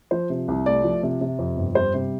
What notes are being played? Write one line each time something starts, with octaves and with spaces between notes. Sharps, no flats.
F3 C5
C3
C2
A3 D5
F3
C3
C3
F2
G1
G3 C5
C3